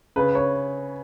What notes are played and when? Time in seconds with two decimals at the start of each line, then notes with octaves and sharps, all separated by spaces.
0.16 C#3 B4
0.35 C#5